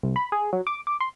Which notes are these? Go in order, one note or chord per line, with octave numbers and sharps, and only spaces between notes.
C2
B5
G#4
F#3
D6
D6
C6